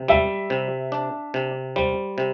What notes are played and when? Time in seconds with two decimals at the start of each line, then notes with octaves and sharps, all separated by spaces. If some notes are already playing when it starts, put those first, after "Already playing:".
Already playing: C3
0.08 G3 E5
0.50 C3
0.92 D4
1.34 C3
1.76 G3 C5
2.18 C3